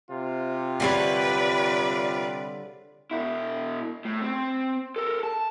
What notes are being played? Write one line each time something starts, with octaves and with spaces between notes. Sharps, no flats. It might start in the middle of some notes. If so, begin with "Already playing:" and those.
C3 F4
D3 G3 B4 C#5 D5
B2 E4
A2
C4
A4 A#4
A5